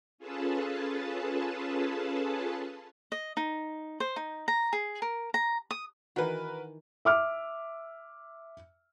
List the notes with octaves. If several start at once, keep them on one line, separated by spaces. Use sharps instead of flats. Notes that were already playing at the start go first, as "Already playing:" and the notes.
C#4 F4 G#4 A4 B4 A5
D#5
D#4
C5
D#4
A#5
G#4
A#4
A#5
D#6
D#3 E3 F#4 A#4 B4
E5 D6 F6